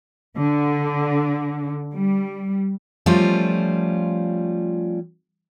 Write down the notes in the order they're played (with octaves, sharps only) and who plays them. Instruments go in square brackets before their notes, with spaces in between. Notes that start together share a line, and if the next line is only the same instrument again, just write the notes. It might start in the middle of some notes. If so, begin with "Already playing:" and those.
[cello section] D3
G3
[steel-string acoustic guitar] F3 G3 A3 C#4 F4